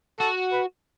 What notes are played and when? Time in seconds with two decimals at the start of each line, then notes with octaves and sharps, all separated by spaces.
0.19 F#4 A4
0.52 B4